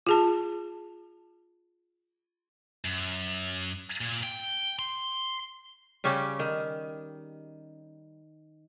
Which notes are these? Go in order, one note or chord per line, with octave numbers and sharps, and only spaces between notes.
F4 G#4 A5
F#2
A#2
G5
C6
C#3 G3 C#4 G4
D#3